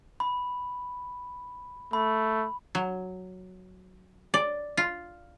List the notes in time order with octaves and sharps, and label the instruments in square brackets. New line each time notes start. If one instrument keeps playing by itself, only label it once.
[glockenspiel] B5
[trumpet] A3 [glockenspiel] B5
[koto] F#3
D5
F4